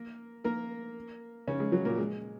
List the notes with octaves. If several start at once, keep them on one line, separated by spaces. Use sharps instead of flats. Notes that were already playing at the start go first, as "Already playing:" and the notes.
Already playing: A#3
A#3 A#4
C#3 C#4
G#3
F#3
A#2 A#3
G#3